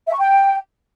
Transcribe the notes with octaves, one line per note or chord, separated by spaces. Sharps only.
E5
C#6
G5